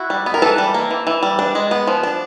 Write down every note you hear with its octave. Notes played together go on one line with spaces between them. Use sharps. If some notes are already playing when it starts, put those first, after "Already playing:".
Already playing: E4 F#4
G3
B3
A#4
E3 A4 B4
G3
A#3
E3
E3
G3
D4
G#3
B3
F3
D4